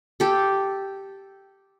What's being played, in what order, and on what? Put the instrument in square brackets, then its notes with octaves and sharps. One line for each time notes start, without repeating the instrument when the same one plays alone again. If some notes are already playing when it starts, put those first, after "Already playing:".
[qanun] G4 A4